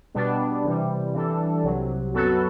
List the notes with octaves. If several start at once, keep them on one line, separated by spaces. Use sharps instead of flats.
B2 G3 B3 D4
C3 E3 G3
E3 G3 D4 A4
C2 C3 F#3
F#2 F#3 B3 F#4 A4